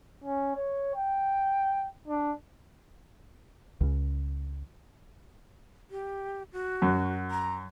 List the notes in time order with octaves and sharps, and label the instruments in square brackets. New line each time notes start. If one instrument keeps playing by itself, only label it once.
[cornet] C#4
C#5
G5
D4
[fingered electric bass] C#2 C#3
[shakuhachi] G4
F#4
[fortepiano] F#2
[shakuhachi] A#5